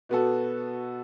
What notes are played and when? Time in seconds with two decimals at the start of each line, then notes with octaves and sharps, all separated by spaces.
0.09 B2 B3 F#4 A4